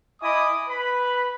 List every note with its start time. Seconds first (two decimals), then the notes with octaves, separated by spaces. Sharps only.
0.22 E4 D#5 G#5 B5 D6 D#6
0.68 B4 B5